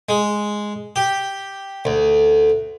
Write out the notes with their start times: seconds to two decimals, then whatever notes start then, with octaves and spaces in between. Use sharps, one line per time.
0.09 G#3
0.96 G4
1.85 D2